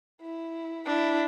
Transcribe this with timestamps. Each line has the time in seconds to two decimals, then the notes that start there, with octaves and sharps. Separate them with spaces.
0.21 E4
0.86 D4 E4